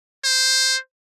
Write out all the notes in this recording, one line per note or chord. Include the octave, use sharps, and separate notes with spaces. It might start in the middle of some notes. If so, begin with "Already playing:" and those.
C5